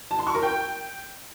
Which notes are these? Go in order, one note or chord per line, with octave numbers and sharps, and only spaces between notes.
A5
C6
C#6
A#4
G5